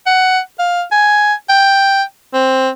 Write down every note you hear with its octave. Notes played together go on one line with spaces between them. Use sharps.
F#5
F5
G#5
G5
C4